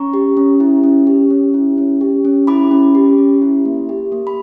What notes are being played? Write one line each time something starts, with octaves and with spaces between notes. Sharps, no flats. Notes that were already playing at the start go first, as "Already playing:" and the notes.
Already playing: C#4 A#5 C#6
G4
C#4
E4
C#4
G4
C#4
E4
C#4
G4
C#4
E4 B5 D6
C#4
G4
C#4
E4
A#3
G4
A#3
B5